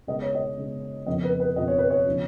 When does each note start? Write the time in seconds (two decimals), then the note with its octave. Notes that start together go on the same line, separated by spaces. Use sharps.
0.07 C#3 G#3 B3 D#5
0.22 C#5
0.35 D#5
0.57 C#3 G#3 B3
1.06 F2 C#3 F3 B3 D#5
1.24 B4
1.40 B4
1.56 F2 C#3 F3 B3 D#5
1.68 C#5
1.78 B4
1.90 C#5
2.05 C#3 F3 B3